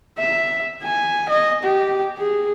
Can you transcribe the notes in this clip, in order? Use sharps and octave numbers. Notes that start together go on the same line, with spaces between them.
E5
G#5
D#5
G4
G#4